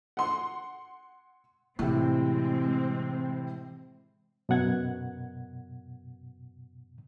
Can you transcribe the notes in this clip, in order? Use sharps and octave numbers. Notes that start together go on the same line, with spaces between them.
F#5 C6
A2 C3 E3 G#3 C4
F#2 B2 F#5 G#6